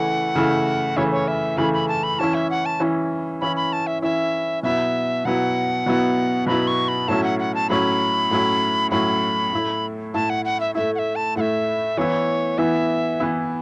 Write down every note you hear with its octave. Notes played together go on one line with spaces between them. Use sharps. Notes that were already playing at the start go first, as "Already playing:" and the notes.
Already playing: C#3 E3 A3 E4 F#5
C#3 E3 A3 E4
C#3 E3 A3 E4 C#5
C#5
E5
C#3 E3 A3 E4 B5
B5
A5
B5
E3 C#4 E4 A5
E5
F#5
A5
E3 C#4 E4
E3 C#4 E4 B5
B5
A5
E5
E3 C#4 E4 E5
B2 F#3 B3 E4 E5
B2 F#3 B3 E4 F#5
B2 F#3 B3 E4
B2 F#3 B3 E4 B5
C#6
B5
A2 F#3 C#4 E4 A5
F#5
F#5
A5
A2 F#3 C#4 E4 B5
A2 F#3 C#4 E4
A2 F#3 C#4 E4 B5
A2 A3 E4
A2 A3 E4 A5
F#5
F#5
E5
A2 A3 E4 E5
F#5
E5
A5
A2 A3 E4 E5 F#5
E3 B3 E4 C#5
E3 B3 E4 E5
E3 B3 E4